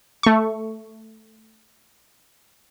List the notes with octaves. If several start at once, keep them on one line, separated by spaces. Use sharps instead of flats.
A3 C#6